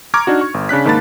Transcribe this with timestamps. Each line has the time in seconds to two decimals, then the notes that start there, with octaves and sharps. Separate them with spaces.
0.14 A#5 C#6 D6 F6 G#6
0.27 D4 D#4 F#4
0.41 C#6
0.54 G1
0.69 C#3 D4 F#6 B6
0.85 G#2 D#3 A#3 A5 B5 A6